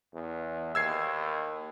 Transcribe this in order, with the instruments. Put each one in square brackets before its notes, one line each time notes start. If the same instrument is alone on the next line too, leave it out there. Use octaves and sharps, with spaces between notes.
[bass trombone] E2
[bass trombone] D#2 [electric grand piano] E6 G#6 C7